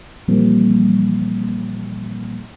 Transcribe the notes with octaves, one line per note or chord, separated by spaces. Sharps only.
A#2 E3 F3 G3 A#3 C4